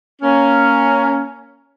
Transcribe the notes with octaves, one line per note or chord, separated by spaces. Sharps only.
A#3 C#4